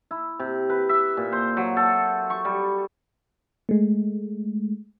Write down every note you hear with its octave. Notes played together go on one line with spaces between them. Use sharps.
E4
C3
B4
E5
A#2
C5
F#3
A4
C#6
G3
G#3 A3